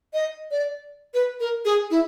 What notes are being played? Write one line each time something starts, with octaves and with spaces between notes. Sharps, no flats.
D#5
D5
B4
A#4
G#4
E4